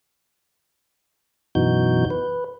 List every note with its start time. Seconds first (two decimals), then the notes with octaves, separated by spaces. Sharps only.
1.55 F#2 B2 E3 D#4 F#4 G6
2.10 B4